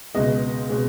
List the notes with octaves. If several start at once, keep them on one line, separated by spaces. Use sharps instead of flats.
C#2 B2 G#3 D#5
B2 G#3